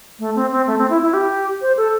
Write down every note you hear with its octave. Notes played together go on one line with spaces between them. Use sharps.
A3
C4
C4
A3
C4
E4
E4
G4
C5
A4